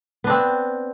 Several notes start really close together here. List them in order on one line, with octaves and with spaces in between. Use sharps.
B3 D4 C4